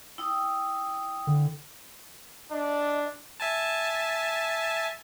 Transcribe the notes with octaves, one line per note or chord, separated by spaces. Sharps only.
E4 G5 D#6
D3
D4 D#5
E5 G#5 A5